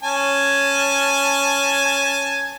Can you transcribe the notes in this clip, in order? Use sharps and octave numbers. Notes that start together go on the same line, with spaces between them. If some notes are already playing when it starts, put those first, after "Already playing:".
C#4 G#5 A5